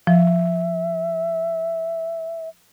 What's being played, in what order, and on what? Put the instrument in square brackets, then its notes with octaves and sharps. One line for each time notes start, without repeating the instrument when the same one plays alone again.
[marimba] F3 [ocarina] E5